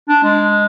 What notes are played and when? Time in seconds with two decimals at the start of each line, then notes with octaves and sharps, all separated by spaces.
0.09 D4
0.24 G#3